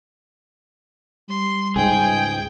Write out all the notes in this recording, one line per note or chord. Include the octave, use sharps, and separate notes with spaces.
G3 C6
C#2 G#2 G#4 G5